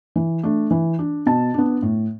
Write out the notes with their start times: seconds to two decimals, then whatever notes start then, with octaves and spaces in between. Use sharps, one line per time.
0.16 E3
0.43 A3 D4
0.71 E3
0.99 D4
1.26 B2 A5
1.54 B3 D4
1.82 A2